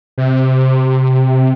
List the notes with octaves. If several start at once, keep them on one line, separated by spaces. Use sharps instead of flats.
C3